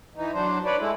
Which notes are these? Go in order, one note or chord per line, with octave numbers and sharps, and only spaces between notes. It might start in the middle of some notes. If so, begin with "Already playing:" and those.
E3 D#4
F#3 D4 C5
B4 C#5 D5
G#3 A3 E4